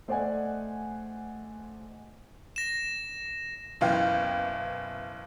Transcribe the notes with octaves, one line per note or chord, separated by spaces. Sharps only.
A3 C5 D5 D#5 F#5 G#5
A#6 E7
F#1 B2 E3 F5 G5